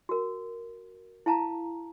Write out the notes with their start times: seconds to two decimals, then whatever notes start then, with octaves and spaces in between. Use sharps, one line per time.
0.09 F#4 A#4
1.26 E4 F5 A5 A#5